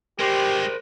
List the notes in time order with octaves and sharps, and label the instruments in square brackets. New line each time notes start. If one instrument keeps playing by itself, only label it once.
[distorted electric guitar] D#3 G#3 [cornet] G4 [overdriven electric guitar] A#4 C5